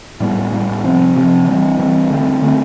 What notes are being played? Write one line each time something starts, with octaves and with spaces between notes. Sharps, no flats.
A2 G3 B3
A2 G3 B3
C3 F3 C4
C3 F3 C4
E3 G3 C4
E3 G3 C4
D3 A3 C4
D3 A3 C4